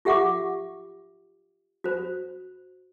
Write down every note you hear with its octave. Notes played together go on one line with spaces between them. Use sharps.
F4 G4 E5 F#5 C#6 D6
F#4 C5